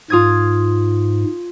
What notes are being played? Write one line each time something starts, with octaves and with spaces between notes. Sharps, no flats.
G#2 F4 D#6 G#6